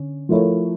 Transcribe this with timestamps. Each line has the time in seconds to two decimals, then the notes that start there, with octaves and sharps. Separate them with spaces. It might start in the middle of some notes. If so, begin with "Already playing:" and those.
Already playing: D3 C#4
0.29 F3 A3 E4 A#4 C#5